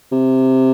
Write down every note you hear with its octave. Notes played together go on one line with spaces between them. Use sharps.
C3